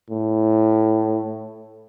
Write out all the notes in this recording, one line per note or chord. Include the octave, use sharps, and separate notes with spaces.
A2